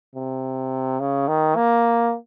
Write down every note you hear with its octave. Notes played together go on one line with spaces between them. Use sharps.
C3
C#3
D#3
A#3